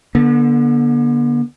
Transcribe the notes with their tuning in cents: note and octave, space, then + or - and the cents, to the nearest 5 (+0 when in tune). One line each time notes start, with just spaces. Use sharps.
D3 -5 B3 -45